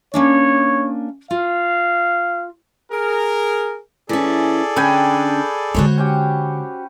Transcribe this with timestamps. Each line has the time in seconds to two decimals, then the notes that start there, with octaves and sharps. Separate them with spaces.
0.14 A#3 C#4 D4 C#5
1.31 F4 F5
2.92 G#4 A#4
4.09 E3 C#4 G#4 A4 D5
4.76 D3 C#4 D4 B4 G5 G#5
5.75 D3 G#3 F#4 C5 C#5
5.98 C#4 G4